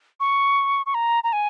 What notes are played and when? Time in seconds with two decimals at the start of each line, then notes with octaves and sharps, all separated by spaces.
0.20 C#6
0.86 C#6
0.94 A#5
1.24 A#5
1.33 G#5